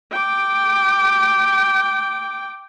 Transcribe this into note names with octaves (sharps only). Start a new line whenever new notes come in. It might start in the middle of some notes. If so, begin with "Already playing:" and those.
G5 D6